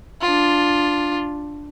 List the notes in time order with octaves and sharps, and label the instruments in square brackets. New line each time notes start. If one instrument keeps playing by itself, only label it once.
[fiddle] D4 F4